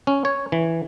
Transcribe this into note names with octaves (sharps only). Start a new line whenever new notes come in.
C#4
C#5
E3